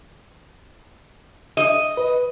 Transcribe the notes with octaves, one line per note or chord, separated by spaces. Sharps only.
D#5
B4